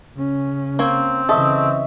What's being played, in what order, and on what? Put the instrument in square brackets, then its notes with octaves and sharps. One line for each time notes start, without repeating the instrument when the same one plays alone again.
[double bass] C#3 C#4
[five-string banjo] A#3 C#5 [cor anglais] C4
[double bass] C#3 E3 [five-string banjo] A4 [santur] D#5 E5 C#6